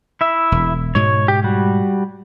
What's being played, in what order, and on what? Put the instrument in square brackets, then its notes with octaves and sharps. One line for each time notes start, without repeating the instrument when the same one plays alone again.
[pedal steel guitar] E4 E5
[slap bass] E1
[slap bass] G#2 B2 G#3 [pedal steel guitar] C#5
[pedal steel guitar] G4
G3 F#4